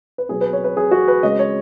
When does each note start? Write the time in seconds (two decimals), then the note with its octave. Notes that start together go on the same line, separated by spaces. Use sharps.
0.18 B4
0.29 B2 F#3 B3 G#4
0.41 B4
0.53 C#5
0.64 B4
0.77 G#4
0.91 F#4
1.08 B4
1.23 C#3 G#3 C#4 D#5
1.39 C#5